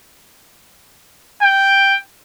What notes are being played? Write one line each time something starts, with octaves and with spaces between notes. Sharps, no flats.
G5